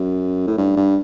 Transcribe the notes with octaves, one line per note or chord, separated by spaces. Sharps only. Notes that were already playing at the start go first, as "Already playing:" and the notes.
Already playing: F#2
A2
G2
G2